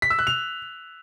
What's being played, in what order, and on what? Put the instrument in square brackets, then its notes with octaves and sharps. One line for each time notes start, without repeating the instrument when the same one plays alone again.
[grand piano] B6
E6
F#6
F7